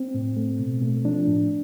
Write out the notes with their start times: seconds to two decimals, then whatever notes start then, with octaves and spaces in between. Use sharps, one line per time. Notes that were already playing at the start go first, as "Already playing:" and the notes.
Already playing: C4
0.14 A2
0.37 A3
0.59 B2
0.82 A3
1.05 F3 D4
1.28 A2